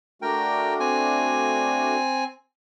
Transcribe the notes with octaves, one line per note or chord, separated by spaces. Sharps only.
A3 D4 F#4 A#4 G5
C4 G#5